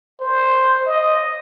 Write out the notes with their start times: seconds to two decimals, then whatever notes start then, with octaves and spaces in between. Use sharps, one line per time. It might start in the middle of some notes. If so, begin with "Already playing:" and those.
0.20 C5
0.86 D#5